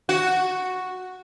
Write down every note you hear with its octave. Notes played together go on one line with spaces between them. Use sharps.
F#4